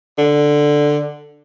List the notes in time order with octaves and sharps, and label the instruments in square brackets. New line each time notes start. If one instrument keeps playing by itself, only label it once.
[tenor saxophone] D3